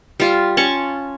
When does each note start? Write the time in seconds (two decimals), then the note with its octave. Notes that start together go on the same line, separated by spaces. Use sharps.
0.20 G3 F4
0.57 C#4 A5 C#6